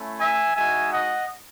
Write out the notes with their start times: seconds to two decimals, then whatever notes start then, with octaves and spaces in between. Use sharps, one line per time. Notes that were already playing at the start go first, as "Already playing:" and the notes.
Already playing: A3 C#4 E4
0.20 E5 G#5
0.56 G#3 D#4 F#4 E5 G#5
0.92 D#5 F#5